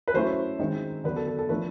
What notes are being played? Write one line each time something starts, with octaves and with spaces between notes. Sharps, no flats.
B4
F#3 A3 C#4 E4 C5
D#3 G#3 C4 D#4
D3 F#3 B3 B4
A4
A4
A4
A2 F3 A3 D4 B4